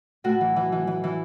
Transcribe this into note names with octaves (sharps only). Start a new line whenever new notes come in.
A2 F#4
E3
E3
E3
E3
E3